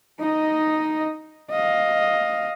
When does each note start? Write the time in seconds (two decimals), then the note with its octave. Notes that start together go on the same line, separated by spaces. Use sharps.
0.20 D#4 D#5
1.51 D#5 F5